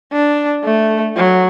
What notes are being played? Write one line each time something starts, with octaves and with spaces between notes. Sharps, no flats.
D4
A3
F#3